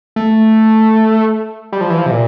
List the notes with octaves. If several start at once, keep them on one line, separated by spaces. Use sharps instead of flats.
A3
G3
F3
E3
F3
C3
A#2